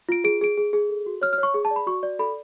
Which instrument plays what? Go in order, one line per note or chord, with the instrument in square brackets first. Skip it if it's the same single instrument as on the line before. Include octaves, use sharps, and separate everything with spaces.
[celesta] F4 D7
G#4 D7
G#4 D7
G#4
G#4
A4
F#4
C#5 F6
F6
C#5
C#6
G#4
A5
D5
B5
F#4 C#6
D5
A4 B5